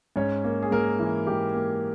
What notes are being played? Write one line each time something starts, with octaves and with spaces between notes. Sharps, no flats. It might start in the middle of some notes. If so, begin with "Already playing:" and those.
G#2 C#4 C#5
A#3
G#4
G#2 A#3 A#4
E3
G#2 G4
A#3